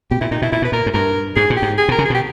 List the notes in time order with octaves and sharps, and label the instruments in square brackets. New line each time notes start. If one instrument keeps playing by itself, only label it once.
[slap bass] B2 [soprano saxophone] G4
[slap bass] A#2 [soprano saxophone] E4
[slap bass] A#2 [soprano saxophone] D#4
[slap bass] B2 [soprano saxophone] E4
[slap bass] A#2 [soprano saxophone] E4
[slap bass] B2 [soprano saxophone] B4
[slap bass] A#2 [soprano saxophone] A#4
[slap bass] G#2
[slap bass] G2 [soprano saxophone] A#4
[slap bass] G#2 [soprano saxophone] G#4
[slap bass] A#2
[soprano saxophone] G4
[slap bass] G#2
[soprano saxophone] G#4
[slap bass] B2 [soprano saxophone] A#4
[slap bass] C#3
[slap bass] B2 [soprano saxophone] G#4
[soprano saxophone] G4